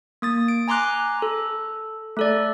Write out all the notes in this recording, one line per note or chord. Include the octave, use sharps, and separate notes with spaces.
A#3 D#6 A6
D7
G#5 A#5 C6 D6 F#6
A4
A3 A4 D5